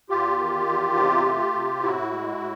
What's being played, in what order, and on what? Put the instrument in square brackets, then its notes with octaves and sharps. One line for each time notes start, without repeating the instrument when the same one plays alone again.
[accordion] E2 F4 G4
D#3
E2
C3
A3
C3
A2 E4 F#4
G#3
A2